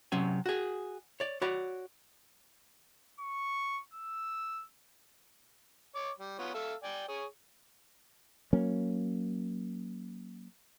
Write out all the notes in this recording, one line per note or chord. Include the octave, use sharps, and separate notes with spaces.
C3 F#3 C#4 G#5
F#4 G#4
C#5 D5
F#4 C#5 D5 B5
C#6
E6
C#5 D6
G3
B3 F4 C#5
A4 E5 F5
D5 G5 G#5
G#4 C#5
F#3 A#3 C#4